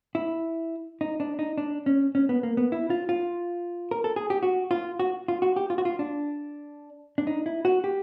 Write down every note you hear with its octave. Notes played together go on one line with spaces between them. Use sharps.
E4
D#4
D4
D#4
D4
C#4
C#4
B3
A#3
B3
E4
F4
F4
A#4
A4
G#4
G4
F#4
F4
F#4
F4
F#4
G4
F4
F#4
F4
D4
D4
D#4
E4
F#4
G4